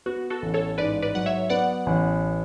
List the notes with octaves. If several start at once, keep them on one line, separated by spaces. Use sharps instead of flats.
B3 F#4
F#4 A4
A1
A4 C#5
G#2 B4 D5
B4 D5
F#3 F#5
C#5 E5
B3 D5 F#5
A1